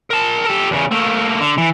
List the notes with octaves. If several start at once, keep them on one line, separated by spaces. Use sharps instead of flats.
A#4 A5
G4 A4
E2 C#3
A3 A#3
D3
E3